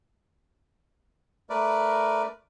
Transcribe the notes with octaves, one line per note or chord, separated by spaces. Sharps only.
A3 A#4 B4 D5